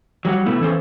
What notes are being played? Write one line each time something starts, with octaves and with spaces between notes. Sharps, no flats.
F#3 G3 F4 F#4
B2 A3 B3 E4
E3 C#4 A4 C5